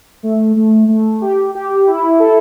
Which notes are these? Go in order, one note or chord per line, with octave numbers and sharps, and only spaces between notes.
A3
A3
A3
G4
G4
E4
A4